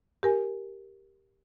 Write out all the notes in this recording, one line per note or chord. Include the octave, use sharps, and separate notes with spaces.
G4 A#4 G#5